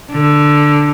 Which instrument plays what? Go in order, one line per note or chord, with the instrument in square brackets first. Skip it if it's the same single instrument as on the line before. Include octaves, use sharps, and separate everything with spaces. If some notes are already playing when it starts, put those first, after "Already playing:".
[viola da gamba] D3